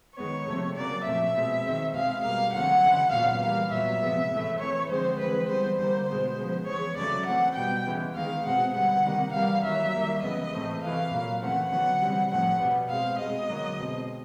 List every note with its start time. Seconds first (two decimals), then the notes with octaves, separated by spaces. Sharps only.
0.17 D#3 G#3 B3 C#5
0.47 C3 F3 A3 C4
0.76 C#3 F#3 A#3 D5
1.05 A#2 F3 A3 C4 E5
1.36 B2 G#3 C4
1.64 D#3 G#3 C4
1.94 B2 G#3 C4 F5
2.24 B2 G3 A#3 F5
2.54 D3 F#3 A3 C4 F#5
2.84 C#3 E3 G#3
3.12 A#2 F#3 B3 F5
3.42 E3 G3 A#3 F5
3.72 A#2 F#3 B3 E5
4.02 C3 F3 G#3 B3
4.32 A2 E3 A3
4.60 E3 A3 C4 C#5
4.90 D3 F3 G#3 C4 C5
5.20 E3 G#3 C4 B4
5.50 E3 G3 B3 C5
5.79 D3 G3 A#3 C5
6.08 B2 G#3 B3 C5
6.39 C#3 F3 G#3 B3
6.68 E3 G#3 B3 C#5
6.97 C#3 F#3 A3 D5
7.27 E3 A3 C4 F#5
7.57 B2 G3 B3 G5
7.87 C#3 E3 G#3 B3
8.16 D#3 G#3 B3 F5
8.46 B2 G#3 C4 F#5
8.75 D3 G3 B3 F#5
9.05 C3 D#3 G3 A#3
9.34 E3 G3 A#3 F5
9.64 D#3 F#3 A#3 E5
9.94 D#3 G3 A#3
10.23 C#3 E3 G#3 B3 D#5
10.53 A2 E3 A3 C4
10.83 C3 E3 A3 F5
11.12 A#2 F#3 A#3
11.42 C#3 E3 A3 C4 F#5
11.71 D3 F#3 B3 F#5
12.01 C3 E3 G3 C4
12.30 A2 F3 A3 C4 F#5
12.60 B2 G3 B3
12.89 B2 G#3 C4 F5
13.19 B2 G#3 C4 D#5
13.49 D3 F#3 A#3
13.79 B2 G#3 C4